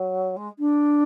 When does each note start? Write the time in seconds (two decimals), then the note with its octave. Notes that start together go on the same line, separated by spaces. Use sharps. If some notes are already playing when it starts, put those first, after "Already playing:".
Already playing: F#3
0.36 G#3
0.59 D4